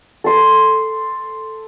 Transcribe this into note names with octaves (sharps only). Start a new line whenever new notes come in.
A4 C6